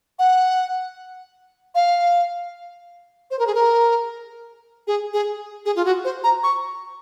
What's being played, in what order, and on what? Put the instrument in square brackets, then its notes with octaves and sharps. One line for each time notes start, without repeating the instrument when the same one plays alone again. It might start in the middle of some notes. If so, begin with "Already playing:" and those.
[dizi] F#5
F5
C5
A#4
G#4
A#4
G#4
G#4
G#4
F4
F#4
C5
A#5
C#6